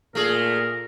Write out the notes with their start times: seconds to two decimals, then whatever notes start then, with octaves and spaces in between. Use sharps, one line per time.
0.15 A#2 A3 G#4 A#4